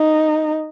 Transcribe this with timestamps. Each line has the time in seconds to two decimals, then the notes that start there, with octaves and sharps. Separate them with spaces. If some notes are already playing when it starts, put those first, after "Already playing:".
Already playing: D#4